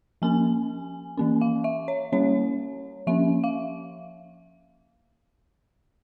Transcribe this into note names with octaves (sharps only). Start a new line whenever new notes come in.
F3 A#3 C#4 G#5
E3 A#3 C#4
F5
E5
C#5
G3 A#3 C#4 C#5
F3 A#3 C#4 E5
F5